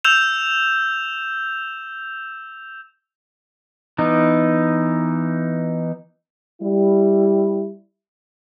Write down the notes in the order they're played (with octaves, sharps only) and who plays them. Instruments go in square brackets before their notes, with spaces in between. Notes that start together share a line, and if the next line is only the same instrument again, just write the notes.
[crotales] E6 G6 E7 F7
[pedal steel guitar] E3 B3 D#4
[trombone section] G3 E4